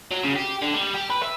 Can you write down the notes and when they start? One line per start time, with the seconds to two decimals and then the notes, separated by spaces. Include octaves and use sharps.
0.11 F#3
0.24 C#3
0.36 G4
0.62 D3
0.74 G3
0.95 G4
1.10 B4
1.23 E5